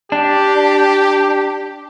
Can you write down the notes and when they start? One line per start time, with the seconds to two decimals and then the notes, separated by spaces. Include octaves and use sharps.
0.12 D4 G4